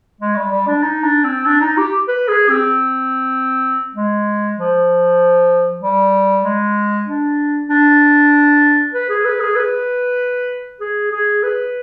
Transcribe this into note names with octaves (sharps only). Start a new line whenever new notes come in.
G#3
G3
G3
D4
D#4
D4
C4
D4
D#4
G4
B4
G#4
C4
G#3
F3
G3
G#3
D4
D4
B4
G#4
B4
G#4
B4
G#4
G#4
B4